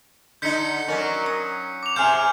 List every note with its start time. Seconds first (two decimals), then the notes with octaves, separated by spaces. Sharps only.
0.42 D3 D#4 G6 B6 C#7
0.88 F#3 C#4 F#4 A#4 D5
1.26 D#6
1.83 D6 F7
1.96 C3 E4 G#4 F5 F6 G6